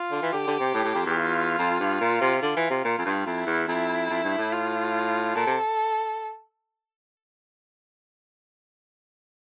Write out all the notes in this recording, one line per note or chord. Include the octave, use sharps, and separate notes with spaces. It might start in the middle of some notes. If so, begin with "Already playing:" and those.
Already playing: F4
D3
E3
D3 G4
D3
C3
A2
A2
F2
E2
F4
F2
G2
A#2
C3
D3 F4
E3
C3
A#2
F2
G2
F2 E4
E2
F2 E4
F2
G2
A2
F4
A#2 A4
C3